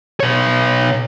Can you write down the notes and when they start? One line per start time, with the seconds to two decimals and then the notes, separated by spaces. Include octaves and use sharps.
0.20 B2 C#5